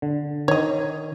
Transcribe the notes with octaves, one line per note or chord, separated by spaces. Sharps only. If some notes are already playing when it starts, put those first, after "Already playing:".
D3
D#3 C#5 D#5